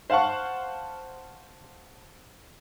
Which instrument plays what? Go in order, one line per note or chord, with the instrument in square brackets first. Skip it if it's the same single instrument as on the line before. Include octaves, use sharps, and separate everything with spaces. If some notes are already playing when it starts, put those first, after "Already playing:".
[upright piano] C5 F5 F#5 A5 C#6